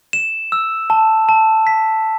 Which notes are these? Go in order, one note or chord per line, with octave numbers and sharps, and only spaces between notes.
E7
E6
A5
A5
B6